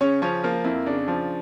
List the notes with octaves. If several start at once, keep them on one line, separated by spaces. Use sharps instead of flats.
C#3 C#4 C#5
F3 C#4 C#5
F3 A#3 F4
F2 E4
C#3 D4
F3